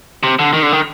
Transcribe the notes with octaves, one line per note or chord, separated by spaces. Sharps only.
C3
D3
D#3
D3
D#3